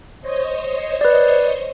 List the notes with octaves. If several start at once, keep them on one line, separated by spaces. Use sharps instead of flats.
C5 C#5 D#5
B4 D5